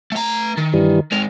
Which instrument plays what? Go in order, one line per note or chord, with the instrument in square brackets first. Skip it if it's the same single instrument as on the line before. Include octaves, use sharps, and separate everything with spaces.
[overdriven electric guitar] A3 A#5
D#3
[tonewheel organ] G2 E3 G3
[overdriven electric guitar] D#3 G#3 [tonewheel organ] F6